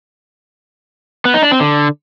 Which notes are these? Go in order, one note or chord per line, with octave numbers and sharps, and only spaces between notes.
B3
D#4
D4
C4
D3